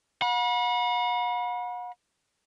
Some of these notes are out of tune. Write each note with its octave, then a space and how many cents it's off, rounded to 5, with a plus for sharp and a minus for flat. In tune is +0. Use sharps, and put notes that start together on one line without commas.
F#5 -40 B5 -35